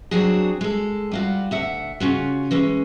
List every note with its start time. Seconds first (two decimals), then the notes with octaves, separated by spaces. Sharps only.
0.11 F#3 C4 D4 F#4 G#4
0.61 G#3 A4
1.11 G3 F4 F#4
1.51 D2 E5 F#5
2.00 C#3 C#4 F4 F#4
2.51 E3 G#3 C#4